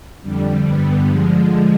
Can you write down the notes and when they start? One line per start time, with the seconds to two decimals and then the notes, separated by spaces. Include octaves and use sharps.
0.22 F2 D3 G3
0.64 G2 D3 G3 B3
1.07 D3 F3 G#3